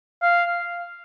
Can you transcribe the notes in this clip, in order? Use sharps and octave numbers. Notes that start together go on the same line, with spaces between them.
F5